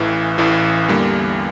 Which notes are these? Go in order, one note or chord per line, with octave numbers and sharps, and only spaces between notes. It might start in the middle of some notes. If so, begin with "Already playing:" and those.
Already playing: A1 A2 E3
A1 A2 E3
E2 D3 G3 A#3